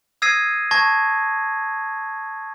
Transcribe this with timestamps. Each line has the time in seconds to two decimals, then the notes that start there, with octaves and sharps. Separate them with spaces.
0.22 D#6 E6 G#6 A#6 C7 D#7
0.71 A5 C#6 G#6 A#6